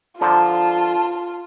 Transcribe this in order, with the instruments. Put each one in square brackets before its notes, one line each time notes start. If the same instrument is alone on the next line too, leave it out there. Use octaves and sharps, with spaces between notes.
[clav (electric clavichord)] D3 F3 A#4 [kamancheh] F4 [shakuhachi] A5